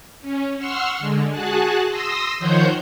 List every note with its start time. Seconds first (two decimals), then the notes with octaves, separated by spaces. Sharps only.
0.22 C#4
0.58 F#5 C6 C#6 E6 F6
0.99 D3 G#3
1.29 F#4 G#4 A5 F#6
1.88 C6 D#6 E6 A#6
2.39 D#3 F3 C5 C#5 F#5 G6